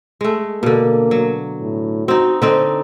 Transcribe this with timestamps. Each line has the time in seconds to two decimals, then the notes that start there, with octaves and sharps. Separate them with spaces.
0.21 G#3 A3
0.63 B2 D3 A#3
1.11 F#3
1.61 A2
2.08 C4 D#4 F#4
2.42 D3 C4 D#4 C5